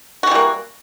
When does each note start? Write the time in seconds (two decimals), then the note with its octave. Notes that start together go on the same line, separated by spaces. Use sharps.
0.23 F#4
0.27 E3
0.31 G3
0.35 A#3